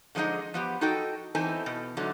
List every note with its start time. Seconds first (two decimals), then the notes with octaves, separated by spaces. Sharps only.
0.15 D3 F3 G#3 A#3 D#4 D#5
0.54 F3 B3 G4
0.81 D#4 F#4 A4 D#5 G5
1.35 E2 E3 C4 D#4 A4 G#5
1.66 B2
1.97 G#2 D3 F#3 A3